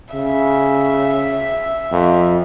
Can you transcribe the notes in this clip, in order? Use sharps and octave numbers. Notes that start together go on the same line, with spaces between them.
C#3 E5
F2